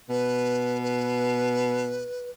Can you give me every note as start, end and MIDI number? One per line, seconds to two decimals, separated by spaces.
0.09 2.08 47
0.09 0.81 71
0.82 2.30 71